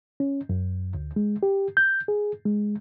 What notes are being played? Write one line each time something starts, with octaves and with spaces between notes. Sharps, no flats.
C#4
F#2
D2
G#3
G4
G6
G#4
G#3